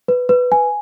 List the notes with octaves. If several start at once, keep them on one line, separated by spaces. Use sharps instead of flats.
B4
B4
G#5